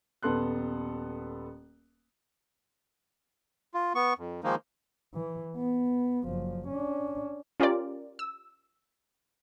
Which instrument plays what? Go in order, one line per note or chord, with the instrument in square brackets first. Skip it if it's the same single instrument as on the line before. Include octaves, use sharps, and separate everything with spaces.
[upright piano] D#1 B3 A4 C6 F#6
[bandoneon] F4
B3 C#6
F2
D#3 F3 G#3 A#3 D#4
[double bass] E3
B3
F#1 F3
C#4 D4
[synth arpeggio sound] C#4 F4 G4 A#4 D5
E6